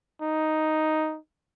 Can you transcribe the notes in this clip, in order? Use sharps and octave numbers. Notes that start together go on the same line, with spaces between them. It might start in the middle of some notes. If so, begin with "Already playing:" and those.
D#4